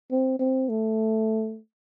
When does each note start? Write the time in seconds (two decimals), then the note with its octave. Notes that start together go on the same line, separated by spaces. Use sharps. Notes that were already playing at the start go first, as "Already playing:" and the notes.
0.11 C4
0.39 C4
0.69 A3